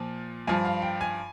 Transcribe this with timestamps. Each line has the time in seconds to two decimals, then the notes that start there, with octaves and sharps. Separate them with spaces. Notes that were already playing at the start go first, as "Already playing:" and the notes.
Already playing: A#2 F3
0.47 G2 F3 G#5
0.65 F5
0.82 G5
1.01 G#5